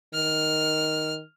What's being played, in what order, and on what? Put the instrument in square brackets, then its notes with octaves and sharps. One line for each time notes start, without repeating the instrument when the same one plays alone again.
[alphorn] D#3 [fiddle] F6